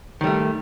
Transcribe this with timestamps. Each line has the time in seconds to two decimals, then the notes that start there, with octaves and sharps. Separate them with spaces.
0.21 D#3
0.24 G3
0.27 A3